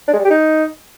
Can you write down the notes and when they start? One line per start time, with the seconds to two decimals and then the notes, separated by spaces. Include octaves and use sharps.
0.07 D4
0.13 G#3
0.19 G3
0.25 G4
0.30 D#4